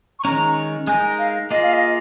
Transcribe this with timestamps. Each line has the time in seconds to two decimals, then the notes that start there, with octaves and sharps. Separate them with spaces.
0.19 C#6
0.25 D#3 G#3 C#4 A#5
0.87 G#3 D#4 A#4 G#5
1.19 F5
1.51 A#3 F4 G#4 D#5
1.62 F5
1.74 D#5